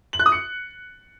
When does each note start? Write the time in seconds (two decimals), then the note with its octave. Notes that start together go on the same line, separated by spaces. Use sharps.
0.13 F#7
0.19 F#6
0.26 D#6
0.32 C#7